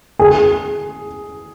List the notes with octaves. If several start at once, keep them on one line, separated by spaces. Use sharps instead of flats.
G#4